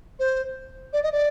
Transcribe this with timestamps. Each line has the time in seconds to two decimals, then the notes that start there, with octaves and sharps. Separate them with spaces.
0.19 C5
0.93 D5
1.03 D#5
1.12 D5